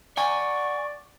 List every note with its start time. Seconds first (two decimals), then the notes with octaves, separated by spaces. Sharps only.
0.17 D5 F#5 G#5 C#6